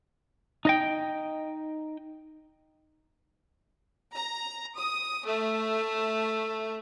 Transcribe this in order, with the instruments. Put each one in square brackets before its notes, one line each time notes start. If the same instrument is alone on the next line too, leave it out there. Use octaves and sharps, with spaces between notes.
[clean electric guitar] D#4 D#5 G5
[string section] A#5
D#6
A3